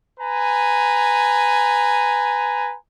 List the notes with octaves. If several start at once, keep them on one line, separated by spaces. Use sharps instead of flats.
B4 G#5 A#5